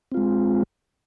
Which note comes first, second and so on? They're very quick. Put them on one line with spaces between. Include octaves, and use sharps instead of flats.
C4 F4 G#3